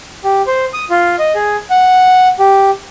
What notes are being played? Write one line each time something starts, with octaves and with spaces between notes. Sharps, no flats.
G4
C5
D#6
F4
D#5
G#4
F#5
G4